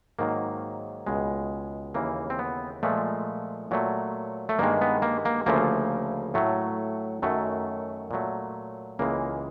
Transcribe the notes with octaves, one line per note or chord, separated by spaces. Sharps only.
G#2 D#3 F#3 A#3
C#2 B2 G#3
D#2 C#3 E3 A#3
C4
B3
A#2 F3 G#3 A3
A#2 F#3 A3
A3
G2 D#3 G#3 A#3
B3
A#3
A#3
D2 C#3 F3 A3 A#3
A2 F#3 A3
F#2 D#3 F#3 A3
A#2 F#3 A3
C#2 C#3 E3 G#3 A#3